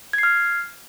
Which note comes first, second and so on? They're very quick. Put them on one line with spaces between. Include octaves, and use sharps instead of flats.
G#6 C7 F6